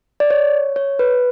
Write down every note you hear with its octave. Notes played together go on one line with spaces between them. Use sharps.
D5
C#5
C#5
B4